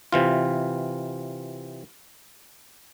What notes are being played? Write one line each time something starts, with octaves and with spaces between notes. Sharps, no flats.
C3 E3 F4